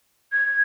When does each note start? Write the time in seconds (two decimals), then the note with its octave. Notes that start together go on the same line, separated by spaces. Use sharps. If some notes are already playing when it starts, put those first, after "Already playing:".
0.33 G#6